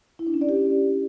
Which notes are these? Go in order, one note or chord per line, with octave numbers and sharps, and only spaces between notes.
E4
D4
C#4
D5
G4